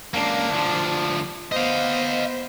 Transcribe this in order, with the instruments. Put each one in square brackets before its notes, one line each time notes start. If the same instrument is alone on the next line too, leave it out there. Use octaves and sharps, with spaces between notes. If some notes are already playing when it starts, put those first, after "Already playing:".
[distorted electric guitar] C#2 A#3 [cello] D4
[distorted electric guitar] D2 F3
[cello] B3 C5 [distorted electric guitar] D#5 F5